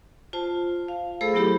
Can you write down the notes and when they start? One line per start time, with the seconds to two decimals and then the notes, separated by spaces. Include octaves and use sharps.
0.33 F4 C5 A5
0.88 F5
1.21 A3 G#4 A4 C5 B5 E6
1.34 F#3 A3 B3 E4 G4 B5